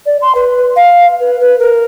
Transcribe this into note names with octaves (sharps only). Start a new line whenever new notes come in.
D5
C6
B4
F5
B4
B4
A#4